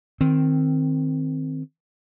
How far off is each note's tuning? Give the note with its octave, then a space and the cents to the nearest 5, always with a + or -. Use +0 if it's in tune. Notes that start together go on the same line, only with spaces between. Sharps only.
D#3 +0 C4 +0